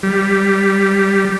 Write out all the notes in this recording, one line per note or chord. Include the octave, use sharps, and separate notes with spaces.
G3